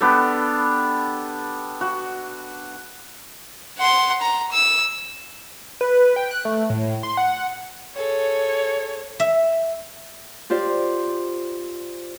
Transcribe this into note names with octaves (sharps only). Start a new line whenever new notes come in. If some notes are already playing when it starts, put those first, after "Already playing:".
B3 D4 G4 A4
F#4
F#5 C6
A#5
E6
B4
G5
F#6
A3
A2
C6
F#5
G#4 A4 C#5
E5
F4 G4 C5 D5